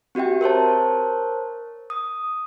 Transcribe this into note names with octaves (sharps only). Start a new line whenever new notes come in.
C4 F#4 G4 E5 G5
A#4 C5 C#5 A5
D#6